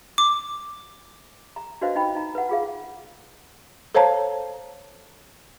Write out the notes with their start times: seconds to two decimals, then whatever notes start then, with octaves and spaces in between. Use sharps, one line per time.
0.18 D6
1.56 A#5
1.81 D4 F#4 B4 C5 D#5 F5
1.95 D#4 E4 G5 B5
2.15 D#4 A#5
2.35 B4 F#5
2.49 F4 G#4 F5
3.94 A4 C5 C#5 F5 A5 A#5